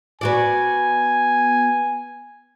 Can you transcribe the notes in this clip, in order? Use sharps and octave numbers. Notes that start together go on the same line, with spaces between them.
B3 F#4 D5 G#5